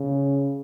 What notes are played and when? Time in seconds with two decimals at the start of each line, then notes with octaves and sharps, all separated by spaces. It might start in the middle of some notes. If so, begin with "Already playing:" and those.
Already playing: C#3